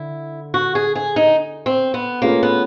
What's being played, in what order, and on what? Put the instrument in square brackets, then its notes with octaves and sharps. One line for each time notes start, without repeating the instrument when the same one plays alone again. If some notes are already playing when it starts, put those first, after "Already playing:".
Already playing: [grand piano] D3 [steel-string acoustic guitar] E4
[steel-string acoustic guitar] F#4
G#4
G#4
D#4
C4
B3
[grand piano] A3 C#4 F4 G#4 B4 [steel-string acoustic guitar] A#3
[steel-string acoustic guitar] B3